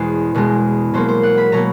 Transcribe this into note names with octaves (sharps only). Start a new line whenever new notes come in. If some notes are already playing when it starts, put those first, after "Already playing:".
Already playing: E2 B2 G#3 C5
E2 B2 G#3
B2 F#3 A#3 C5
C5
F#5
B5
B2 F#3 A#3 A#5